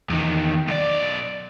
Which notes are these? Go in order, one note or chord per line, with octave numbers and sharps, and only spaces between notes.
E2 D#3
B1 D5